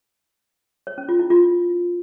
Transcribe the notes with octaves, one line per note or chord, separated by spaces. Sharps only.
C#5
C#4
F4
E4
F4